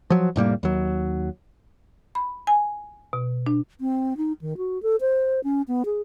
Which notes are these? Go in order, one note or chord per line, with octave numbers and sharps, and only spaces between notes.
F3 F#3
F1 A2 G3 A#3
D#2 F#3
B5
G#5
B2
D4
C4
D#4
D#3
F#4
A4
C5
C#4
B3
G#4